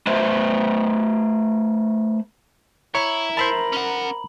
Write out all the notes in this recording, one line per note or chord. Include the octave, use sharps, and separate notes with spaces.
A3 B4 C5 E5
E4 C#5 A#5
A#4 C5 E5 A5 B5 F#7
C#4 F#5